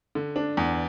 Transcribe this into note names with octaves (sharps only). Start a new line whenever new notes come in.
D3
D4
E2